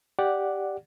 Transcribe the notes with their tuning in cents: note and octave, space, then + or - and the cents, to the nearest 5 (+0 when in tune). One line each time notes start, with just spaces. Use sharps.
G4 +0 D5 +0 F#5 +0